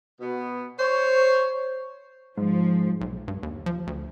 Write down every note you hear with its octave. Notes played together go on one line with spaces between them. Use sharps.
B2 B3
C5 C#5
G#2 F3
B1
G2
D#2
F3
D2